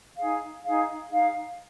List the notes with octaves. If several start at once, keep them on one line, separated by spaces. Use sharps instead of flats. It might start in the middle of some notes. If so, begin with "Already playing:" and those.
D#4 G#4 F5
D#4 G#4 F5
D#4 G#4 F5